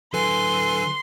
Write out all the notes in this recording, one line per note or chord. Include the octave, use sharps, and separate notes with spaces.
D3 F#3 A4 B4 G#5 C6